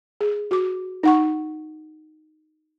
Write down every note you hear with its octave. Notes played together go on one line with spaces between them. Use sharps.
G#4
F#4 D6
D#4 F#5 C#6